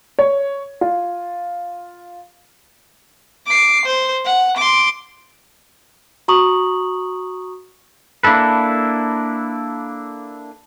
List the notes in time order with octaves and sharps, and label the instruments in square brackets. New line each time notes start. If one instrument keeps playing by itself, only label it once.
[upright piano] C#5
F4
[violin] D6 C7
C5
F#5
C6 D6
[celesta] F#4 A#5 C#6 D#6 F#7
[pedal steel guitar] A#3 D4 E4 A4 B4